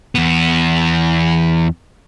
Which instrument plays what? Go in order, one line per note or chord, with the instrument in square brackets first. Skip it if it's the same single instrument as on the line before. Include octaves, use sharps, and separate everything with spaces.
[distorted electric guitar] E2 B3